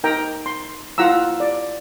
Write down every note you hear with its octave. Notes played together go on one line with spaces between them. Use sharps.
D#4 A#4 G5 A#5
C6
E4 F4 F#5 A#5 E6
D5